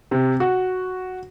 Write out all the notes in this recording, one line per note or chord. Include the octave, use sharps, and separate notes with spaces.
C3
F#4